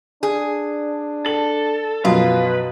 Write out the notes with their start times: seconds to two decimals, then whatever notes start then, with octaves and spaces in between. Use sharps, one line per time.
0.23 D4 G#4
1.26 A4 F#7
2.05 F#2 B2 F3 F4 B4